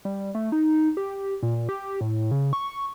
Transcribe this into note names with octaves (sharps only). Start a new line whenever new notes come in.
G3
A3
D#4
G4
A#2
A#2
G4
A2
C#3
C#6